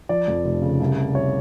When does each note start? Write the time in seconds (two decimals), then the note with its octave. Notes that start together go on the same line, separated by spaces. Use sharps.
0.09 F3 D5
0.28 F2
0.44 F1
0.62 C#3
0.80 C2
0.97 C3
1.15 C2 C#5